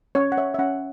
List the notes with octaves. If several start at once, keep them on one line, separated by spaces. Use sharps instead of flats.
C#4 C#5
F#5
C#5 E5
E5
C#4 F#5